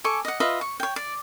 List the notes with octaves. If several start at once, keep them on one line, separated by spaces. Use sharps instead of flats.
A4 G#5 C#6 D6
D#5 F#5
F4 B4 D#5 E5
C#6
C#5 G5
D5